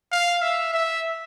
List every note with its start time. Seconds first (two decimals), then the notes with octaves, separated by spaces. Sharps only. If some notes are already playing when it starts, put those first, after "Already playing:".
0.12 F5
0.42 E5
0.73 E5